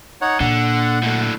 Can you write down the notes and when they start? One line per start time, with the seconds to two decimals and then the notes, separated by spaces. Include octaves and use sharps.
0.21 D#4 C#5 F#5
0.40 A#2 D3 F#5
1.03 A2 D3